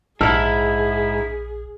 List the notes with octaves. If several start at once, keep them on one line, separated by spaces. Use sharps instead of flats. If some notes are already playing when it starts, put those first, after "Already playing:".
A#1 G#2 E4 G#4 A5 E6 F6